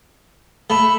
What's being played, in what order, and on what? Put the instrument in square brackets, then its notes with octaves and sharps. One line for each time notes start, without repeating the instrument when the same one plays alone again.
[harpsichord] A3 [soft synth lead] B5